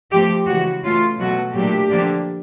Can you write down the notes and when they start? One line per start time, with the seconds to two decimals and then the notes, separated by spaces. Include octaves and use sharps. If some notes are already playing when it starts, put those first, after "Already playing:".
0.12 F3 A3 C4 G4
0.47 C#3 E3 G#3 F#4
0.83 E3 A3 C#4 F4
1.18 B2 F#3 A3 F#4
1.54 A#2 F#3 A3 D4 G4
1.90 D3 F3 A#3 D4